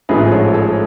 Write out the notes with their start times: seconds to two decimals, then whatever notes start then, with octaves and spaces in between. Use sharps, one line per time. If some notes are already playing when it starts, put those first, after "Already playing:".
0.09 A1 G#2 F3 A3 G#4 B4
0.31 A4 C#5
0.54 A4 C#5